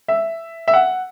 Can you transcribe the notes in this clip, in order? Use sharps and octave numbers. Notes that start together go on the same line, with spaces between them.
E5
E5
F#5